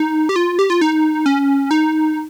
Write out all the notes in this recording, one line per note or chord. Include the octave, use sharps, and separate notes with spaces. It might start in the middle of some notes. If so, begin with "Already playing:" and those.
Already playing: D#4
G4
F4
G4
F4
D#4
C#4
D#4